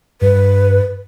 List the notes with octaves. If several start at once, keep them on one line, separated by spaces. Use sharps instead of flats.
G2 B4